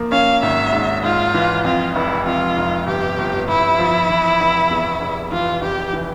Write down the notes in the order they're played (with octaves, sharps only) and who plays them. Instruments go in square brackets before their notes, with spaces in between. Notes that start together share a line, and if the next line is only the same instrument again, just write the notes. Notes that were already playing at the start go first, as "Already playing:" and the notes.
Already playing: [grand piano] F3 A#3
[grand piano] C#4 [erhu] F5
[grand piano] G#1 [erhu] E5
[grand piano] G#2
[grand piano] G#2 [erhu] F4
[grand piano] E3
[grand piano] F2 [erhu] F4
[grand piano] F1 [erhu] E4
[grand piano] F2 [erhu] F4
[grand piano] F1
[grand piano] G1 [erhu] G4
[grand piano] G1
[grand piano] G1 [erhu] E4
[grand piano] F3
E3
F1
E2
F1
[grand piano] E3 [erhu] F4
[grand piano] F1 [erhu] G4
[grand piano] E3